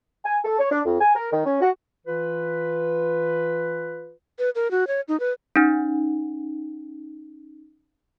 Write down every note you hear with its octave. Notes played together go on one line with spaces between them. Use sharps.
G#5
A4
C#5
D4
F2
G#5
A#4
D#3
C#4
F#4
E3 F4 B4
B4
A#4
F#4
C#5
D#4
B4
C#4 D#4